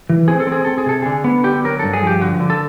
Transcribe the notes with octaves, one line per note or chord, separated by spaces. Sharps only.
E3
C4 G#4
A4
C4
G#4
C4 A4
G#4
C3 A4
D3 G#4
B3
D3 G4
F#3 A#4
G2 A4
G#4
F3 G4
D3 F#4
D3
A4